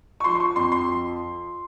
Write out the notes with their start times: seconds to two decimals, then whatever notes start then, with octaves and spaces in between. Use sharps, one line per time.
0.20 C#6
0.24 F3 C6
0.35 C6
0.40 C#6
0.56 F2 C6
0.72 C6
0.88 F3